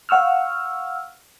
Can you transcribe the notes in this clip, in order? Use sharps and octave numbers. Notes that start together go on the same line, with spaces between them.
F5 F#5 C#6 E6 F6